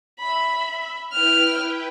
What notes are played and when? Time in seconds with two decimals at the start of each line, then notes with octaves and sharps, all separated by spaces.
0.20 E5 B5
1.12 E4 B4 G5 F6